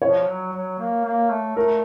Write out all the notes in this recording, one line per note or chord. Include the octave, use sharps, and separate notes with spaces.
F3 C#5
F#3
F#3
A#3
A#3
A3
A3 A#4